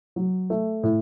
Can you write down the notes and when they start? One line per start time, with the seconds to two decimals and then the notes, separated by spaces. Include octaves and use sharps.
0.16 F#3
0.50 A3
0.83 A2